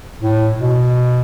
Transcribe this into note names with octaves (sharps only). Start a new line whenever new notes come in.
A2
B2